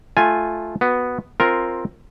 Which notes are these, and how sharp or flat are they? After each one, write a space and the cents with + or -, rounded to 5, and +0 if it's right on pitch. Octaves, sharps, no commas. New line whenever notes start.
A3 -10 F4 +0 G#5 +0
B3 +0 F#4 +0
C4 +10 F4 +0 A#4 +0